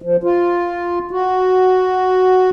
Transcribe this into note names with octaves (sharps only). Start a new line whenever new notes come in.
F3
F4
F#4